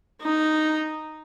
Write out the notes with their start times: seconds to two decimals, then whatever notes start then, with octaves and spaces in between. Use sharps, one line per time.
0.22 D#4